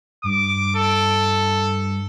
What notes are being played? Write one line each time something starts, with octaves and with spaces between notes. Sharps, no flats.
G2 D6
A4